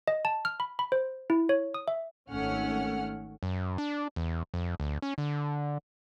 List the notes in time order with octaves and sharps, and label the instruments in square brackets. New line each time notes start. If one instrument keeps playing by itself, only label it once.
[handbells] D#5
A5
F6
B5
B5
C5
E4
C#5
D#6
E5
[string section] G#1 A3 C#4 F#5 F6
[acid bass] F#2
D4
E2
F2
D2
C#4
D3